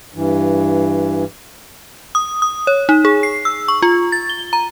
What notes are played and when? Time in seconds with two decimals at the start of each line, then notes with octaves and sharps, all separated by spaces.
0.14 G2 E3
2.15 D#6
2.42 D#6
2.67 C#5
2.89 D#4
3.05 G#4
3.23 C7
3.45 E6
3.68 C#6
3.82 F4
4.12 A6
4.29 G7
4.53 A#5